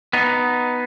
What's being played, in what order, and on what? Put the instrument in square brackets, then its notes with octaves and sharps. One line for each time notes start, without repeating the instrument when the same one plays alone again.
[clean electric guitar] B3 D#4